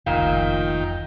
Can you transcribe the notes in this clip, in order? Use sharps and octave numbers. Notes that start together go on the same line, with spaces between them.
F1 C#2 A#2 D#3 F5 G5